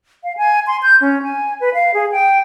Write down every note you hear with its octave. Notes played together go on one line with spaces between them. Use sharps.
F5
G#5
C6
G6
C#4
G#5
B4
F5
G#4
G5